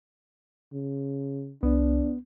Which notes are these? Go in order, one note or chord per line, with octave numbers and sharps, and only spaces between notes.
C#3
C2 B3 D4